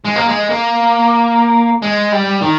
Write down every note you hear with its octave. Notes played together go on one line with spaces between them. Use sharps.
G#3
A#3
G#3
A#3
G#3
G3
D#3